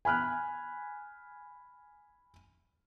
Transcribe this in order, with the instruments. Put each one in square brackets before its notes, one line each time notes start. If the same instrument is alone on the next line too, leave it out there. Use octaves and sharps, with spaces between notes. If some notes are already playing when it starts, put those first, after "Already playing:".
[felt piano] G#5 B5 F6 F#6